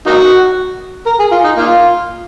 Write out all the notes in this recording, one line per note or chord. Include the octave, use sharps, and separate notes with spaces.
A#3 D#4 F#4
A#4
G#4
F4
D#4
A#3 F4